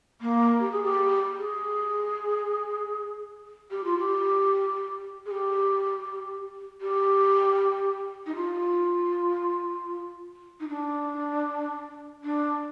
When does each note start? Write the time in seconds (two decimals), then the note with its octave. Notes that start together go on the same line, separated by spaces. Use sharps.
0.21 A#3
0.60 G4
0.72 G#4
0.83 G4
1.38 G#4
3.71 G4
3.84 F4
3.98 G4
5.26 G#4
5.31 G4
6.81 G4
8.26 D#4
8.35 F4
10.60 D#4
10.68 D4
12.24 D4